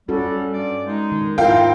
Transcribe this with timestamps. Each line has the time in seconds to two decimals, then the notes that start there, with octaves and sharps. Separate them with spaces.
0.08 G3 C#4 F#4 A4
0.53 G2 D5
0.86 G#3 D#4
1.12 D#3
1.38 G#2 C4 E4 F4 A#4 F5 G5